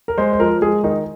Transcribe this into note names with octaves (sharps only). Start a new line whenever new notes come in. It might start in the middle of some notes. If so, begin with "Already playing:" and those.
A#4
G#3 C5
C5
F3 A#4
G#3 G#4
D#3 D#4